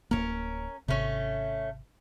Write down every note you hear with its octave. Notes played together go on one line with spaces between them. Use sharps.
D1 F#2 A#3 C#4 A#4
G#1 C3 A3 C#4